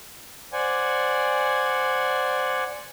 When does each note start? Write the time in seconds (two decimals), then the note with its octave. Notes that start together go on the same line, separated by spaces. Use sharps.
0.53 C5 D5 F#5 G#5